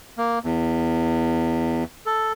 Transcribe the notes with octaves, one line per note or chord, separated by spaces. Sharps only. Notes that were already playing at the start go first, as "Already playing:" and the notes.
A#3
E2
A4